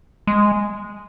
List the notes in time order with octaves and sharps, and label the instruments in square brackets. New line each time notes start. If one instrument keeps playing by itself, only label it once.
[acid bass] G#3